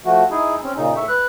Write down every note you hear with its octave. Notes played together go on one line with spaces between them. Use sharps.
F3 A3 F#4
D#4 E4 G#4
C4 C#4
A#2 C#3 D#4
A2 E5 C#6
B4 F#6